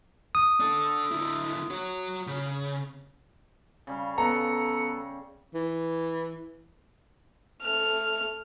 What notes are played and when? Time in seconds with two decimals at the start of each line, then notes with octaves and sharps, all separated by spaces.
0.35 D#6
0.60 D4 A4
1.12 D3 E4
1.70 F#4 C#5
2.27 C#3
3.87 C#3 G3 F5
4.18 B3 A4 A#5 C#7
5.54 E3
7.62 A3 F6